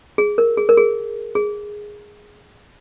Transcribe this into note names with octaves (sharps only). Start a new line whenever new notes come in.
G#4
A#4
G#4
A#4
G#4
G#4